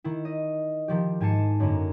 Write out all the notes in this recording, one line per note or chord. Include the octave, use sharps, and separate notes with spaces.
D#3 E4
D#5
D#3 F3 G4
G#2 G#5 A5 C7 C#7 E7
F#2 D3 A#3